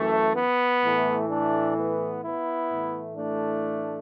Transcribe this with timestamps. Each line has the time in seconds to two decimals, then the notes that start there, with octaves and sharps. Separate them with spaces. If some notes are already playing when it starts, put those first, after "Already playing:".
Already playing: F#2 E3 A3
0.34 B3
0.81 A2 E3 A3
1.29 A3 D4
1.76 B3
2.23 B3 E4
2.70 A2 E3 A3
3.17 A3 D4